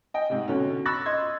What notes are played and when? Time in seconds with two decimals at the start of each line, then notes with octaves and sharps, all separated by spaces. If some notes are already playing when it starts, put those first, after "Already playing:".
0.14 D#5 G5
0.30 G#2 C3
0.48 B2 D3 C#4
0.85 B5 C#6 E6 F#6 A6 A#6
1.06 D#5 C6 G#6